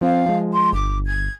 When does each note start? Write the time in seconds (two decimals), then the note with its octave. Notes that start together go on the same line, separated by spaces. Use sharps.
0.01 F3 C4 F5
0.26 F3 G#3
0.53 C6
0.73 G1 D6
1.06 G#6